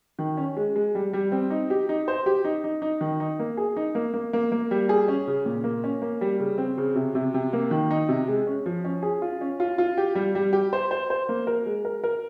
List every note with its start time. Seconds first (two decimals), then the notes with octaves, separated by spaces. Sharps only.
0.19 D#3
0.37 C#4
0.57 G#3
0.76 G#3
0.95 G3
1.13 G3
1.32 C4
1.50 D#4
1.70 G4
1.89 D#4
2.08 C5
2.26 G4
2.45 D#4
2.64 D#4
2.82 D#4
3.01 D#3
3.20 D#4
3.39 A#3
3.57 G#4
3.77 D#4
3.95 A#3
4.14 A#3
4.33 A#3
4.52 A#3
4.71 G3
4.89 G#4
5.08 C#4
5.27 C#3
5.46 A#2
5.64 A#3
5.84 C#4
6.02 A#3
6.21 G3
6.40 C#3
6.58 C4
6.78 C#3
6.95 C3
7.15 C3
7.34 C3
7.53 A#3
7.71 D#3
7.91 D#4
8.09 C3
8.28 G#3
8.47 C#4
8.66 F3
8.85 C#4
9.02 G#4
9.22 F4
9.41 C#4
9.60 F4
9.78 F4
9.98 G4
10.15 G3
10.35 G3
10.53 G4
10.73 C5
10.91 C5
11.10 C5
11.29 A#3
11.47 A#4
11.66 G#3
11.85 A#4
12.04 A#4